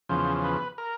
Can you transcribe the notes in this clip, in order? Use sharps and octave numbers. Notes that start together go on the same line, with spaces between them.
E2 C#3 F3 C5
B4
A#4